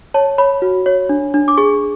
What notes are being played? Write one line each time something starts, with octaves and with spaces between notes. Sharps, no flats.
C#5 A5
C#5 B5
F#4
C#5
D4
D4
D6
G#4 C#6